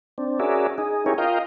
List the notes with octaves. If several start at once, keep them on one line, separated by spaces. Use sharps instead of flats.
C4 D4
C#4 F#4 G#4 A#4 D5 E5
D#4 G#4
C#4 E4 G4 G#4 A#4 C#5
F4 A#4 D#5 F5 G5